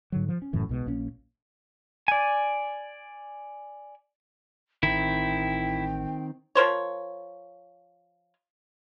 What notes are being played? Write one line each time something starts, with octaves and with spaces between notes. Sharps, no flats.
G#2 D3 F#3
F3
C#4
F#1 F#2 A2 E3
B1 B2 G#3
A#1 A#3 C#4
D5 G#5
A1 D#3 C4 E4 G5
F3 A#4 C5 C#5